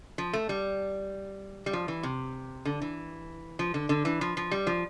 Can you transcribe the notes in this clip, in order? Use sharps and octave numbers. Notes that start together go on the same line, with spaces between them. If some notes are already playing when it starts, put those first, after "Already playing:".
F3
A3
G3
G3
F3
E3
C3
D3
E3
F3
D3
D3
E3
F3
F3
G3
F3